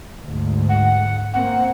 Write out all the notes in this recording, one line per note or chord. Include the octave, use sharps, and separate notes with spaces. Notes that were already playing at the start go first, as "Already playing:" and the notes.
D2 G#2
F#5
A#3 C4 F#5